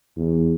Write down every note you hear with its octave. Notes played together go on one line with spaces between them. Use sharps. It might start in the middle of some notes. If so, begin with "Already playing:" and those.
E2